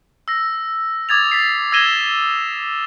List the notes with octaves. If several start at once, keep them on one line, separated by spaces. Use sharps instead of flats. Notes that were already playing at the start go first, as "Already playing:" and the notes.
E6 A#6
D6 D#6 G#6 A6 F7
A6 B6 C7
E6 G#6 A#6 D#7 E7 G7